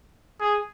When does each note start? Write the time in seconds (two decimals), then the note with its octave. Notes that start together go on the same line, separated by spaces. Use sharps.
0.40 G#4